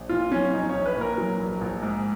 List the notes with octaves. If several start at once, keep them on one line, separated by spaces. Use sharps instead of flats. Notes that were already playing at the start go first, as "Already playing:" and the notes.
Already playing: A#1
A#2 F4
F#3 C#4
A#1 D#4
C#5
A#1
B4
A#2
A#4
F#3
A#1
A#1
G#2